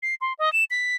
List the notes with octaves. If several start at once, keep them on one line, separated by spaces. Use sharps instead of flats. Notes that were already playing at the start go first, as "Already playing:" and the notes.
C7
C6
D#5
E7
B6